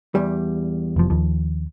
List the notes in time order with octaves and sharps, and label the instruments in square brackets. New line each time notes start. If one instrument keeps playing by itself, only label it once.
[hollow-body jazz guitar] E2 G3
[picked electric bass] F1 F3
D#2 F3